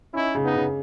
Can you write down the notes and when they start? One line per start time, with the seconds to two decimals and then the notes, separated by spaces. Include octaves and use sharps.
0.14 C#4 D#4 E4
0.35 C#3
0.45 B3 D#4
0.55 C#3